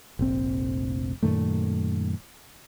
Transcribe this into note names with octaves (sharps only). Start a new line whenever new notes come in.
F1 A#1 C4
F#2 A#2 D#3 A3